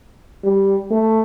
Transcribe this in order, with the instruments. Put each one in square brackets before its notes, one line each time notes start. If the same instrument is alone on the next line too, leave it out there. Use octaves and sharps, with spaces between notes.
[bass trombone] G3
A3